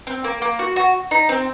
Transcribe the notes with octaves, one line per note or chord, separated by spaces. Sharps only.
C4
A#3
A#3
F#4
F#4
D#4
C4